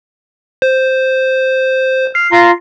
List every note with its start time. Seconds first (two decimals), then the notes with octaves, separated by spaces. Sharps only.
0.62 C5
2.15 F6 C7
2.32 F4 A#5 C6